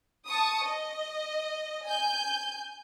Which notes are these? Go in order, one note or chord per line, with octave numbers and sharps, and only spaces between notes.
A5 C#6 D#6
D#5
G#5 G6